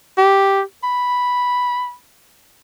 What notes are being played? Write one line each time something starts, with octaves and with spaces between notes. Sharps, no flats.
G4
B5